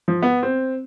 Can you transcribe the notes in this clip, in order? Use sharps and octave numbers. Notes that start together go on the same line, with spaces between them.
F3
B3
C4